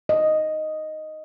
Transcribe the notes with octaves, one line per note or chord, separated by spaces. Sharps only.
D#5